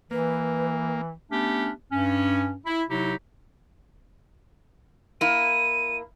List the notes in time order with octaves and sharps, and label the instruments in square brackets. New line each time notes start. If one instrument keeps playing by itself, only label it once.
[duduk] E3 [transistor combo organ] A#3 [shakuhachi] B4
[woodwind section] A3 B3 C#4 D4 G4
G2 C#4
E4
C3 F#3 D#4 E4 G4
[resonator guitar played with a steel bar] A#3 E4 [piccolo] D#7